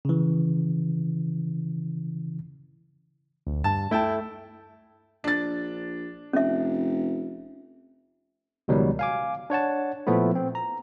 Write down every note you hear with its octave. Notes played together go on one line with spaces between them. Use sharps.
C#3 E3
D2
G2 A5
A3 E4 G5 A5
A#1 D4 A6
F1 C#4 E5
C#2 B2 D#3 F#3 G3
F5 G#5 D6
D4 C#5 F#5 A5
A#2 F3 A3 B3 E4
C4
A#5